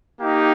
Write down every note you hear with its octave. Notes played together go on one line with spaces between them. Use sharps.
A#3 D#4 G4